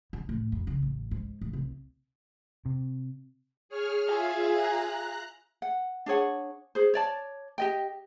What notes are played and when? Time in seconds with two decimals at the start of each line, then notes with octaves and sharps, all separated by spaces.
0.13 D#3
0.29 A2
0.52 F2
0.67 C#3
0.82 A1
1.11 G#2
1.41 A1
1.53 C2
2.66 C3
3.69 G#4 C#5 F6
4.08 F4 G#4 E5 F5
4.55 A#5 F#6
5.62 F#5
6.06 D4 G#4 C#5 F#5
6.75 G#4 C5
6.94 C#5 D5 A5
7.58 G4 D#5 G5